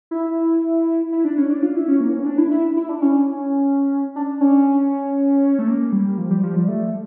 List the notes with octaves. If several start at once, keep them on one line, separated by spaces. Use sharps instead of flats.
E4
E4
D4
C#4
D4
F4
E4
C#4
A#3
C#4
D4
E4
E4
E4
D4
C#4
D4
C#4
A3
A#3
G3
F3
G3
F3
G3
A3